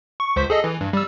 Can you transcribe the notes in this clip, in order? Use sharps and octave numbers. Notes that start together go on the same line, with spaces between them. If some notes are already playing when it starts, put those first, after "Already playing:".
C#6
C#2 C5 B6
G#4 A4 D#5
E3
G2
G3 E6